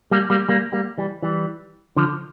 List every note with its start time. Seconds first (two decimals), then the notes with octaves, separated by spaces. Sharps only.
0.11 G3 A#3
0.30 G3 A#3
0.49 G3 A#3
0.73 G3 A#3
0.98 E3 G3
1.23 E3 G3
1.96 D3 F3